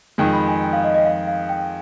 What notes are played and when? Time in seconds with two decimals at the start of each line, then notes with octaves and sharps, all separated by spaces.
0.18 F2 D#3 G#3 G5
0.33 B5
0.47 G#5
0.62 G5
0.73 F5
0.84 D#5
0.94 D#5
1.05 F5
1.28 F5
1.49 G5